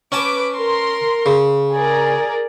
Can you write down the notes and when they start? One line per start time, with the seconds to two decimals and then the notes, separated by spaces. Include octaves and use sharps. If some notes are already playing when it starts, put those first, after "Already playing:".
0.12 C#4 B4 G#5 A5 D6
0.56 A#4 C6
1.26 C#3
1.72 G#4 A#4 D5